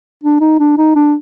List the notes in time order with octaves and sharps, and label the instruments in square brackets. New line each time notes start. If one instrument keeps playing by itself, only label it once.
[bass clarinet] D4
D#4
D4
D#4
D4